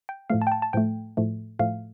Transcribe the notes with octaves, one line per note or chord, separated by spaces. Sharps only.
G5
A2 F3 A3 F5
A5
G5
A5
A5
A2 F3 A3 G5
A2 F3 A3
A2 F3 A3 F5